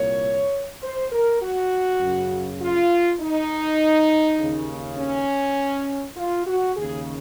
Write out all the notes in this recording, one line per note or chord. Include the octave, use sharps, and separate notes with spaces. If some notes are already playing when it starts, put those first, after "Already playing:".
Already playing: C2 A#2 C#5
C5
A#4
F#4
F#2 C#3
F4
D#4
D#2 C#3
C#4
F4
F#4
D#2 C#3 G#4